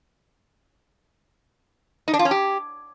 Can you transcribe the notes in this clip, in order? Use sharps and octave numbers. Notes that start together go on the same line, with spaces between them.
D#4
D4
F4
C#4
G4